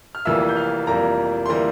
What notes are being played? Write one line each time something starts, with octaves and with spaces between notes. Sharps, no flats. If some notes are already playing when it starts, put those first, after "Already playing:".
F6
F1 F2 E3 G3 A#3 E5 E6
G6
F5 F6
F1 F2 E3 G3 A#3 A#4 A#5
C6
E3 G3 A#3 A#4 A#5